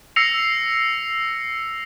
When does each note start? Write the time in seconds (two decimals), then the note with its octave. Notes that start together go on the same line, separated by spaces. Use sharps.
0.16 E6 A#6 C7 C#7 F7